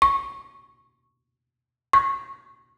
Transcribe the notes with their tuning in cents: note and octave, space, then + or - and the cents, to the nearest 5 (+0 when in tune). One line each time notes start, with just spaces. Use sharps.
C#6 -5
C#6 -20